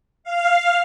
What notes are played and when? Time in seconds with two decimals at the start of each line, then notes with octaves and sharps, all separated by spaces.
0.24 F5